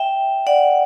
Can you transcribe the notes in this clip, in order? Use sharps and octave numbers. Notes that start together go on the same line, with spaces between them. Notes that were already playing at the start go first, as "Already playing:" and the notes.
Already playing: E5 G5
D5 F#5